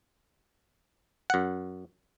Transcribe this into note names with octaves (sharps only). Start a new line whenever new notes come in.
F#2 F#5